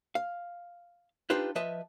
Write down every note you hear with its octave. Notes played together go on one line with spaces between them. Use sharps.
F5
D4 D#4 F4 G4 B4 C5
F3 B4 D#5 E5 A5